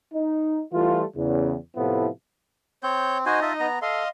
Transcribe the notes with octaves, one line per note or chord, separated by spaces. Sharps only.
D#4
E3 G3 A3 F4
E2 C#3
A2 C3 F3 A3 B3 E4
C4 C#5 G6
D#4 F#4 C5 D#5 G#5
F4 E5 A5
B3 A#5
A4 D#5 F5 C6